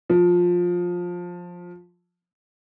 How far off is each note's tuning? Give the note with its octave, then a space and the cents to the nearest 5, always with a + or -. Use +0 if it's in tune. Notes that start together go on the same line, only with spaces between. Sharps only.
F3 +15